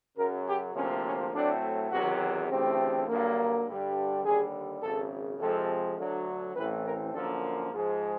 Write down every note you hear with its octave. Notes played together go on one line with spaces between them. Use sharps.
F#2 C#3 F#3 A#4
G4
D2 C3 F3 A#3 C#4
C#4
A2 F#3 A3 C4 D4
E2 C3 D#3 F#3 F#4
D2 C#3 E3 A3 C4 G4
G2 D3 F#3 A#3
G2 D3 G3
D#2 D3 G3 G#4
G#1 F#2 C#3 A4
F2 C3 F3 G#3 C4 A4
D2 D3 F#3
A1 A2 E3 A3 C4 B4
A#4
F#2 D3 F3 A#3 A4
G#2 F3 G#3